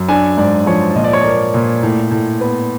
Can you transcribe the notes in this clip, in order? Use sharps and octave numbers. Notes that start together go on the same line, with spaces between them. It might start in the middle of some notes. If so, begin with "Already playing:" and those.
Already playing: F#2
D4 G#5
G#2 D5
F3 C#5
A#2 D#5
D5
C#5
A#3 D5
A#2
A2
A2
B3